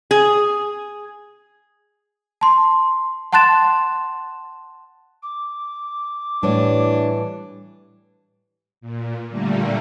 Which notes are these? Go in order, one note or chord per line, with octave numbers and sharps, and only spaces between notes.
G#4
A5 C6
F#5 A5 C6 F#6 A6 E7
D6
A2 E3 G3 D4 C#5
A#2
A#2 D3 G3 A3 A#3